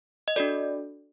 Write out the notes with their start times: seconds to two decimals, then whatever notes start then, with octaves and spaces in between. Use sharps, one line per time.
0.28 D#5
0.36 D4 F#4 A4 D5